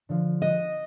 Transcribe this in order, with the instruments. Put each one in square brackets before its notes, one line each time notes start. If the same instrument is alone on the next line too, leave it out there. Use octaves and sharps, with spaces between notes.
[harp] D3 F3
[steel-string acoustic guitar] D#5 [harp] D#6 F#6 D#7